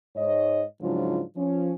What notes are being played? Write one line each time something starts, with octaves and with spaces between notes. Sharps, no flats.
G#2 C#5 D#5
G#2 C#3 F3 F#3 D4 F4
F3 C#4